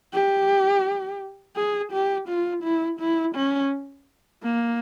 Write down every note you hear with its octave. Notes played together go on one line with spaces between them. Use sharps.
G4
G#4
G4
F4
E4
E4
C#4
A#3